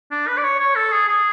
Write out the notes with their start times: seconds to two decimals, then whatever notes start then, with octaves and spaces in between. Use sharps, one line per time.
0.11 D4
0.27 B4
0.37 D5
0.44 C#5
0.60 C#5
0.75 A4
0.92 G#4
1.08 G#4